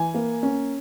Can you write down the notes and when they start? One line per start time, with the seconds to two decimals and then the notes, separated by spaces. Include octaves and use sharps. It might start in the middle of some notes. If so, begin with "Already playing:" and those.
Already playing: E3 G#5
0.14 A#3
0.43 C#4